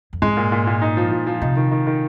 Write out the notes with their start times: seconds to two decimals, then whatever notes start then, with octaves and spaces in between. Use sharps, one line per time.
0.13 F2
0.22 G#2 G#3
0.37 A#2
0.52 A#2
0.67 A#2
0.82 D#4
0.97 F3
1.11 F3
1.27 F3
1.41 C3 D#4
1.56 D#3
1.71 D#3
1.87 D#3